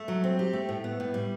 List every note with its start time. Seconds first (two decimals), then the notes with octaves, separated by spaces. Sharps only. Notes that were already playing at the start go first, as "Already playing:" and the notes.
Already playing: A3
0.08 F#3
0.24 C4
0.39 G4
0.53 A3
0.69 A2
0.84 B3
1.00 A2
1.14 G3